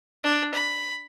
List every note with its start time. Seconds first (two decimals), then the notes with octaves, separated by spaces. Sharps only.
0.24 D4
0.54 B5